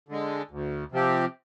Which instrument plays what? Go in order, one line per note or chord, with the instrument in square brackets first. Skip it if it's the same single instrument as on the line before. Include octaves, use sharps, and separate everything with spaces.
[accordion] D3 G#3
D2
C3 F3 C4 G4